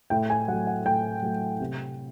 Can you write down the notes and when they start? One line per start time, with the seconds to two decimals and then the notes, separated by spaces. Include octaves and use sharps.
0.10 A2 G5
0.30 G#5
0.48 F#3 F#5
0.52 A3
0.67 F#5
0.85 A2 G5
1.22 F#3 A3
1.60 C3